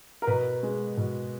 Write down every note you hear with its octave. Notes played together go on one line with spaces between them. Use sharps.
A#4
B2 B4
G#3
B2